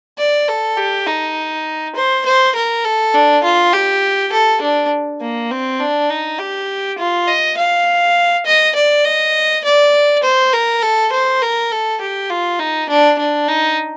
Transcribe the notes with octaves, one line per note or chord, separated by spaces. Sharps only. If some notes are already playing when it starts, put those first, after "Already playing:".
D5
A4
G4
D#4
C5
C5
A#4
A4
D4
F4
G4
A4
D4
A#3
C4
D4
D#4
G4
F4
D#5
F5
D#5
D5
D#5
D5
C5
A#4
A4
C5
A#4
A4
G4
F4
D#4
D4
D4
D#4